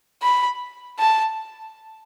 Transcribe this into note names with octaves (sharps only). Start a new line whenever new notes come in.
B5
A5